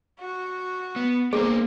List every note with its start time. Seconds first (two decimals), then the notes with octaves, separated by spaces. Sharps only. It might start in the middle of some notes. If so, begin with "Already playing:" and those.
0.20 F#4
0.96 B3
1.33 A#3 B3 D4 G#4 C5